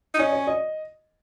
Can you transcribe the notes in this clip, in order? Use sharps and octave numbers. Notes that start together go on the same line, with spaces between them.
D#4
C#4 D#5
C#5
D#5